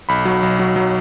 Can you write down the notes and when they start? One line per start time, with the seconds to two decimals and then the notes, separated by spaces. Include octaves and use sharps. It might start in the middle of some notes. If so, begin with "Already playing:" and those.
0.09 B1 B5
0.25 F#3
0.43 B1
0.59 F#3
0.76 F#3